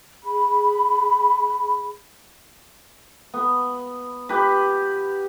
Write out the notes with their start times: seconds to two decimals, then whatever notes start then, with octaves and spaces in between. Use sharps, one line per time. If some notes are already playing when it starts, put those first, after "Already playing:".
0.24 G#4 B5
3.34 B3
4.29 G4 B4